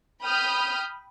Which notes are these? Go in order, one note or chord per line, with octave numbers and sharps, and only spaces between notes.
G5 B5 D#6 F6 G6